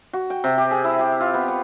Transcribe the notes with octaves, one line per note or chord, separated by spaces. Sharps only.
F#4
G5
C3
G4
G#4
E4
G4
F4
B3
C#6